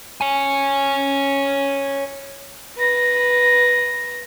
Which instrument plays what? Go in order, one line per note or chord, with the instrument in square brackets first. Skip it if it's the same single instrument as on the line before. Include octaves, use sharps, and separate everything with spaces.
[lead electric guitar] C#5 G#5
[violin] B4 A#6